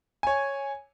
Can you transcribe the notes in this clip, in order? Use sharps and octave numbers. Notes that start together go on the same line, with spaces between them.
C#5 G#5